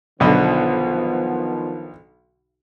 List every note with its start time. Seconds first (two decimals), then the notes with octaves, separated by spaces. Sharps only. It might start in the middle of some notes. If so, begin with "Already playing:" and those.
0.20 B1 B2 D3 D#3 F3 B3